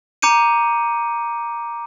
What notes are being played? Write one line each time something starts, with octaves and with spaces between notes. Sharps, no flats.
A#5 D6 G6 C#7 D#7